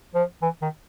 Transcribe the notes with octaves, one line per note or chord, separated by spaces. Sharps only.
F3
E3
D#3